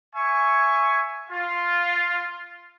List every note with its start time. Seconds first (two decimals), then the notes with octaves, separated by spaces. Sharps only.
0.14 E5 G#5 C#6
1.30 F4